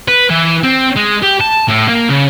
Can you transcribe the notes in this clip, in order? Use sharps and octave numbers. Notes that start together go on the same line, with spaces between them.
B4
E3
C4
G#3
G4
A5
A2
A#3
C#3